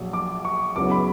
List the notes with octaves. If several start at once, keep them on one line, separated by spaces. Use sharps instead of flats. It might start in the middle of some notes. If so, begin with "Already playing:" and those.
Already playing: A#1 A#2 F#3
D6
C#6
C#2 C#3 F#3 B3 E4 D6
B5